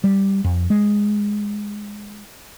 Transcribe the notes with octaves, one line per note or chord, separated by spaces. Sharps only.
G3
F2
G#3